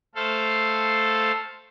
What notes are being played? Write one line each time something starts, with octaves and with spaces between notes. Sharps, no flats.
A3 A4 C5 F5